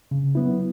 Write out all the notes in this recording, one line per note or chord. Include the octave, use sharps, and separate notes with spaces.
C#3
F#3 B3 E4